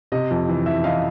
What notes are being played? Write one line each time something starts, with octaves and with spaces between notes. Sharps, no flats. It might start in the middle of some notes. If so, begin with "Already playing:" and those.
C3 D#5
F2
E3
E3 E5
E3 D#5 F5